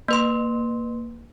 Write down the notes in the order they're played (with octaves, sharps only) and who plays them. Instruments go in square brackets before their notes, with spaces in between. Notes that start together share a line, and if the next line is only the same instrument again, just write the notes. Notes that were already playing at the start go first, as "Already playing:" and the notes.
[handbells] A#3 B4 C6